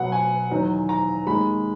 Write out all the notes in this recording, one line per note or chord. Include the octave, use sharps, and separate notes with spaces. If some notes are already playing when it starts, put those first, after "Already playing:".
Already playing: B2 F#3 B3 F#5
G#5
E2 D#3 F#3
A#5
D#2 D#3 G#3 B5